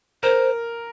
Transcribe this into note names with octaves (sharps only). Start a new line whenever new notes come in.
A#4 C5